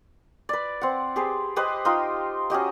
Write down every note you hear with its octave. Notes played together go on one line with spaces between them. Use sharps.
B4 D5
C4 F#5
G4 G#4 B4 C5
G4 B4 C5 D#5
D#4 F4 G5 C6
C#4 F#4 G4 D#5